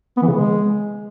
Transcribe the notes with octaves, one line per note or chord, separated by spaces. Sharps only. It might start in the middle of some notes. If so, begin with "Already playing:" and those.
B3
E3
C#3
G#3